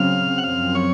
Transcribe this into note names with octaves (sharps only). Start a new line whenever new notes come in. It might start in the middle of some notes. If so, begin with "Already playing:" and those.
Already playing: C#3 F#3 C4 F5
F#5
F#2 F3 C4 F5
C#5